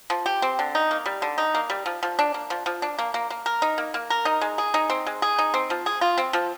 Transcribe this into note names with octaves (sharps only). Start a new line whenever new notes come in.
F3
G4
C4
D3
D#4
A#3
G3
D3
D#4
A#3
G3
F3
F3
D4
A#3
F3
F3
D4
A#3
A#3
A#3
A#4
D#4
A#3
A#3
A#4
D#4
G#3
G#4
D#4
C4
G#3
G#4
D#4
C4
F3
G#4
F4
C4
F3